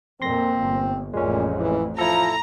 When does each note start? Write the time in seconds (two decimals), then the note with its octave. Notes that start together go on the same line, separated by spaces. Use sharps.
0.22 F2 A#2 A#3 C4 C6 A#6
0.60 G1
1.14 A1 F2 A#2 G#3 C#4
1.59 E3
1.98 F3 E4 A4 A#5